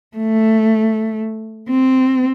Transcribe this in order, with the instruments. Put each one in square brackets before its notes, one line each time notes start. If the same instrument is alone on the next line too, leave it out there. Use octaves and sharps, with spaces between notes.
[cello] A3
C4